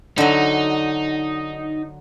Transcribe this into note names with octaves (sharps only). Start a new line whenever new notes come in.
D3 F#3 D#4